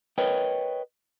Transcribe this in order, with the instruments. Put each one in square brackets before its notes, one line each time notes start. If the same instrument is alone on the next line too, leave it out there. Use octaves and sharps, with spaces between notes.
[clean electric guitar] A#4 B4 C#5 D#5 G5